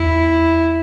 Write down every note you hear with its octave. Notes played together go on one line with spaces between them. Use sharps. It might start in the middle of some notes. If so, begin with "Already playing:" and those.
Already playing: E2 E4